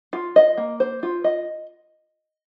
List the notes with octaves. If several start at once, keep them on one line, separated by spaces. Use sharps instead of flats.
F4
D#5
A#3
C5
F4
D#5